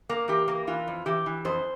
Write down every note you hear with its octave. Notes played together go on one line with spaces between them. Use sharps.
A#3
E3 G4
A#3
E3 F4
F2
E3 G4
E3
F2 C5